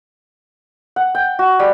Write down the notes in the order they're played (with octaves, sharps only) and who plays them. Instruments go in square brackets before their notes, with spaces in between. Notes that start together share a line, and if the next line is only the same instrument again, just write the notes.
[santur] F#5
G5
F#4
G3